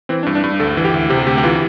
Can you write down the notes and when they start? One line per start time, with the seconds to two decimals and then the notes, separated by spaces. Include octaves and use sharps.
0.09 E3 C4
0.23 D4
0.26 G2
0.35 D4
0.44 G2
0.60 D2 A4
0.77 E3
0.85 G4
0.94 D2
1.10 C3 G4
1.27 D2 G4
1.38 G4
1.44 E3 F4